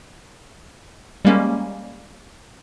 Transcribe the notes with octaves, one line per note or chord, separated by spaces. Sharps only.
G3 G#3 A#3 C#4